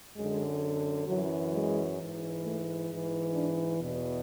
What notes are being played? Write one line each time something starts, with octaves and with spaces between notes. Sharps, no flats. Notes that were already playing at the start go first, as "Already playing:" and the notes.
F#2 D3 G#3
F#2 E3 F#3
G#3
G#2 E3
A3
G#2 E3
D4
E2 B2